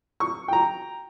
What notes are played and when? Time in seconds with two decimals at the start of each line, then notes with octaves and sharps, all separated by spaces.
0.20 C#6
0.48 G5 A#5